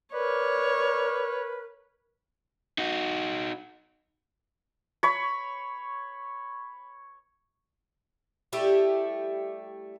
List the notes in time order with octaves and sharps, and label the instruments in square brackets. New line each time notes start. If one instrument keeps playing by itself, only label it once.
[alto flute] A#4 [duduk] B4 [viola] C#5 [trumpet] D5
[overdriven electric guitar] D#4 F#4
[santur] C#5 B5
[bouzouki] G3 A3 E4 G4